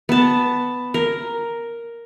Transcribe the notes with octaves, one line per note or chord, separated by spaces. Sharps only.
B3 A5
A#4